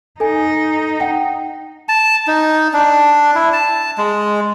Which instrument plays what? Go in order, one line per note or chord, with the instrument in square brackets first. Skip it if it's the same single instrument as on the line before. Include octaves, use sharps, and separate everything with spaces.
[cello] D#4 [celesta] A4 G#5
[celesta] F#5 G5
[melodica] A5
D#4
D4
E4
A5
G#3